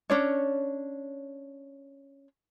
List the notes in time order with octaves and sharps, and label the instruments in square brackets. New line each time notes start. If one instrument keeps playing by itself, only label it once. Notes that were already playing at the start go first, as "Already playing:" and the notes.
[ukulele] C#4 D4 C#5